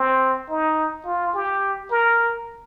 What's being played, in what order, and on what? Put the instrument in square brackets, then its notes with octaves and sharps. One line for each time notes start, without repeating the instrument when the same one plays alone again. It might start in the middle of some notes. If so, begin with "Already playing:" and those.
Already playing: [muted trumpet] C4
D#4
F4
G4
A#4